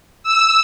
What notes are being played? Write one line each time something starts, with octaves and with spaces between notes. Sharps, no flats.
E6